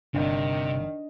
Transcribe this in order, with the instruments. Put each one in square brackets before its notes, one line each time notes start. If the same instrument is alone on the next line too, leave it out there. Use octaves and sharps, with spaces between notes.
[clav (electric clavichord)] G1 [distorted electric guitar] C3 [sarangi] D#3 [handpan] D4